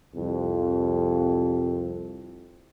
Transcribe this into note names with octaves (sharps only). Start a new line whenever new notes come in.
C2 F2